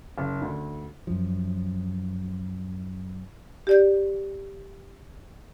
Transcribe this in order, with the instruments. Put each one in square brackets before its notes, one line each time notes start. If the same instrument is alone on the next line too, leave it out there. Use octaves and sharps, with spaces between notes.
[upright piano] F#1
D2
[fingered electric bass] F#2 F3
[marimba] G4 D5 G6